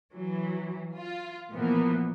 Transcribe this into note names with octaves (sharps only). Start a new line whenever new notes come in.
E3 F#3
F4
A#2 E3 F3 A#3 B3